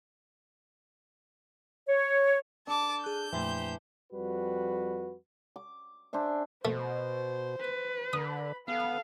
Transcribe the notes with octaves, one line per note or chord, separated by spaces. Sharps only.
C#5
D4 A4 A5 D6
G#4 F#6 G6
F2 A#2 E3 A3 G4 C5
F2 G3 F#4 B4
D6
D4 G#4 C5 E5
B2 A3 C5
B4
D3 B5 D#6
B3 A4 F5